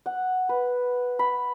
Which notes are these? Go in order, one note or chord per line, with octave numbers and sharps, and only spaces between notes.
F#5
B4
B5